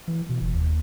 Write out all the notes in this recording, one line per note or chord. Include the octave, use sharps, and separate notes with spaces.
E3
B2
F1
D#2